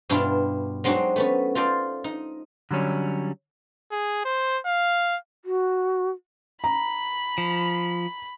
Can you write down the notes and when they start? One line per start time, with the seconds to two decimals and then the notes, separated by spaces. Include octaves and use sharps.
0.09 G2 B2 D4 E4 F4
0.84 F#3 G#3 C4 D4 D#4 F#4
1.16 A3 B3 C#4
1.55 F4 A4 C5 D5
2.04 D#4
2.71 D3 F#3 G3 C#4
3.92 G#4
4.25 C5
4.66 F5
5.45 F#4
6.64 A#5 B5
7.38 F3